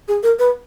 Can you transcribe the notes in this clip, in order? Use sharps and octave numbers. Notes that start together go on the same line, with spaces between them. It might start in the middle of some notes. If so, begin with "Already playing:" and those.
G#4
A#4
B4